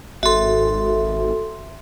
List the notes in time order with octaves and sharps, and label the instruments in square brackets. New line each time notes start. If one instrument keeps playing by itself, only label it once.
[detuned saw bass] G#1 [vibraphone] F#4 A4 [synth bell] E5 C6